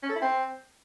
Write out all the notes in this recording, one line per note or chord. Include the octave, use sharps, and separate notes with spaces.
C#4
A4
E4
C4